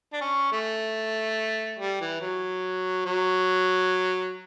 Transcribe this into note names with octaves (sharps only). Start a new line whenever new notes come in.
D4
C#4
A3
G3
E3
F#3
F#3